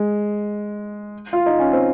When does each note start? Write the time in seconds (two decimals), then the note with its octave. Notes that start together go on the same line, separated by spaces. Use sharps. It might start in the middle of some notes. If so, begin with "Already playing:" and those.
Already playing: G#3
1.33 F4
1.46 D#4
1.59 C#4
1.73 C4